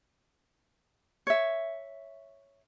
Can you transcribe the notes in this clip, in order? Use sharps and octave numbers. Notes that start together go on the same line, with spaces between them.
C#5 E5